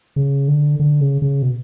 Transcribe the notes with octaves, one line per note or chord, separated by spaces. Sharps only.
C#3
D3
D3
C#3
C#3
B2